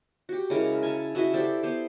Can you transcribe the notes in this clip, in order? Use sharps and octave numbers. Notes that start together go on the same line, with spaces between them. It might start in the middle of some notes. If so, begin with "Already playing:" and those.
F#4 G4
C#3 G#3 E4 A#4
G#5 A5
E4 F#4 D#5 E5
G4 A4 C5 D5
B3 C5 D6